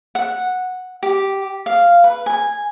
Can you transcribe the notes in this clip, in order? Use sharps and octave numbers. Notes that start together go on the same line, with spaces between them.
F#5
G4
F5
B4
G#5